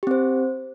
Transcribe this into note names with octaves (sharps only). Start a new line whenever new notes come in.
C4 G4 C5